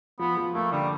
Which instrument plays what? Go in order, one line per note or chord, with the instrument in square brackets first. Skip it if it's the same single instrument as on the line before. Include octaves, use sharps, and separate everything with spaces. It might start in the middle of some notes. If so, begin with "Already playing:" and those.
[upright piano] F3 [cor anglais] B3
[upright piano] F3
[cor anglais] A3 [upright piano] A#3
[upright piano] D3 [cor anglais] G3